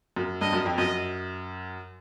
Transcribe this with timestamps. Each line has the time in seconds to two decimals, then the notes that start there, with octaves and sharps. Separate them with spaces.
0.16 F#2
0.41 G2 D#5
0.53 F#2
0.66 F2
0.78 F#2 D#5